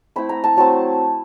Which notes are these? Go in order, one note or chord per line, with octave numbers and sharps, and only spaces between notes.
A3 C4 E4 B5
A#5
A5
F#3 A3 C4 A5